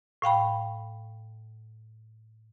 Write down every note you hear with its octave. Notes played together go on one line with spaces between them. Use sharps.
A2 F5 G5 B5